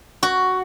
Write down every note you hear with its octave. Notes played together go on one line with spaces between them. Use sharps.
F#4